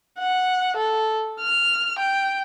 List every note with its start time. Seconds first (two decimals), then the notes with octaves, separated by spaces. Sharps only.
0.19 F#5
0.76 A4
1.40 F6
1.99 G5